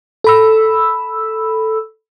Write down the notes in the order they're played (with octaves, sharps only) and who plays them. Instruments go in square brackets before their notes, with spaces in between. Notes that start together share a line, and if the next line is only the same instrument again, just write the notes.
[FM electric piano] A4 B5 E6